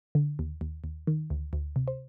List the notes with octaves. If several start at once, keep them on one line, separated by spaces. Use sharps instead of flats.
D3
D#2
D#2
D#2
D#3
D2
D2
C3
C5